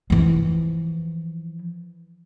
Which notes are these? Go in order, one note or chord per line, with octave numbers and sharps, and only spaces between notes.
E3 F3